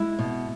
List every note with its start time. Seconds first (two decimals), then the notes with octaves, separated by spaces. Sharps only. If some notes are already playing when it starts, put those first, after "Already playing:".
Already playing: G#3 E4
0.19 B2